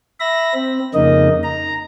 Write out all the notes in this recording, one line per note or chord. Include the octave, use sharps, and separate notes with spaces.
E5 B5 A#6
C4
F2 C#3 A#3 D#4 D#5
A#5